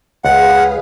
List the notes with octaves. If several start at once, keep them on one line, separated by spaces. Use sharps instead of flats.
C#2 G#4 B4 F5 F#5